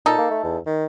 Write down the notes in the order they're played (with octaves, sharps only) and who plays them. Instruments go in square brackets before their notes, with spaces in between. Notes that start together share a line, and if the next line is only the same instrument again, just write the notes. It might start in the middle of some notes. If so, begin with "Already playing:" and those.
[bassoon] A#2 [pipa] D#4 A4
[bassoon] A#3
A3
E2
D#3